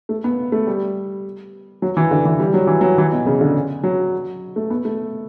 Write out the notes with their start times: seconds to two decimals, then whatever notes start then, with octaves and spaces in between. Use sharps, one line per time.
0.09 A3
0.24 B3
0.52 A3
0.67 G3
1.82 F#3
1.97 E3
2.11 D3
2.25 E3
2.40 G3
2.54 F#3
2.67 E3
2.81 F#3
2.98 E3
3.12 B2
3.26 C#3
3.41 D3
3.83 F#3
4.56 A3
4.70 B3
4.85 A3